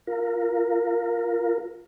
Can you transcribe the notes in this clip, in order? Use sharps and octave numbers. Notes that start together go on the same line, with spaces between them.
F4 A#4